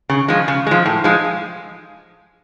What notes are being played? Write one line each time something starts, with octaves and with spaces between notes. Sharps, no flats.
C#3
F3 G#3
C#3
F3 G#3
A2
F3 G#3